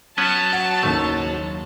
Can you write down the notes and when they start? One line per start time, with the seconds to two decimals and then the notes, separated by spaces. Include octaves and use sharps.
0.18 F#3 B3 C#4 B4 A5
0.53 F#5
0.83 F#1 D#2 A3